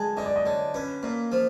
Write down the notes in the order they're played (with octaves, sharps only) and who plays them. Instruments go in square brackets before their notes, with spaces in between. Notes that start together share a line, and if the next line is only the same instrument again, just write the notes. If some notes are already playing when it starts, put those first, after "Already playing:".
Already playing: [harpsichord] G#3 [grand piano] G#5 A5
[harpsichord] D3 [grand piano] D#5
[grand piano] D5
D#5
[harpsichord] D3 [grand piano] C#5
[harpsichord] C#4 [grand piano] B4
[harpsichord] A#2
F3